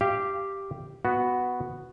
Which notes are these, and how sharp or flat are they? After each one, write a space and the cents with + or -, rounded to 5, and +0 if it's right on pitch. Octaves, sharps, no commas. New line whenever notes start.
G4 +0 F5 -25
B3 +0 F#4 +0